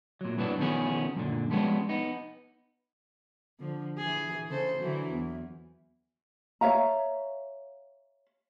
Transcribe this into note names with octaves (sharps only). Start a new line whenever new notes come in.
A#2 F#3
G2 B2 E3 F#3 B3 D4
B2 D#3 F3 B3 C#4 G#4
F#2 A#2 D3
F3 G3 G#3 A#3 B3 C#4
B3 D#4
D3 F3
E3 G#4
C#3 A4 C5
D3 E3 F#3
E2
C#5 E5 F5 A#5